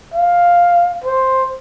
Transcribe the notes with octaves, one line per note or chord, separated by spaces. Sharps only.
F5
C5